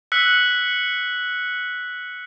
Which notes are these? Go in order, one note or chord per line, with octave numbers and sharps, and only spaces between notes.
E6 F#6 B6 C#7